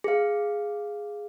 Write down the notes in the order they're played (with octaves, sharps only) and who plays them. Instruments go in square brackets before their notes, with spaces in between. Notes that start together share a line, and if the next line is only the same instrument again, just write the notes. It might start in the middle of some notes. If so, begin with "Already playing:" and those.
[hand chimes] G#4 F5